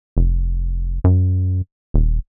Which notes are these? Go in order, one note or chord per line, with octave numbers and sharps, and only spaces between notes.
F1
F#2
D#1